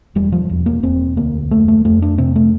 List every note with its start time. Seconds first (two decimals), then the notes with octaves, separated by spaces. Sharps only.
0.15 E1 G3
0.32 F3
0.49 E1
0.66 A#3
0.83 E1 C4
1.16 D2 A#3
1.51 F1 A3
1.68 A3
1.85 F2 A3
2.02 D4
2.18 C3 C4
2.36 A3